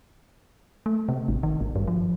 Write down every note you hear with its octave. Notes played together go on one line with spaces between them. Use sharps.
A3
C3
G#1
D#3
G#1
G2
F3